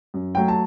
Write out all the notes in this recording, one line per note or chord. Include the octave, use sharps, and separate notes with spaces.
F#2
F#3 A3 G5
A5